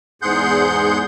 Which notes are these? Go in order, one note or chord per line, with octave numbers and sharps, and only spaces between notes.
E2 G#2 G#4 F#5 C6 G6